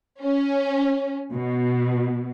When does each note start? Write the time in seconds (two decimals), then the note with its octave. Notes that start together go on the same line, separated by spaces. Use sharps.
0.22 C#4
1.32 B2